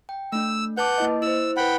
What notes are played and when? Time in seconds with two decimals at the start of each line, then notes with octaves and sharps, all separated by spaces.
0.09 G5
0.32 A3 D4 E6
0.77 B4 F#5 A5 D6 G6
0.98 A#3 E4 D#5
1.22 E4 C5 E6
1.57 E4 B4 F#5 G5 B5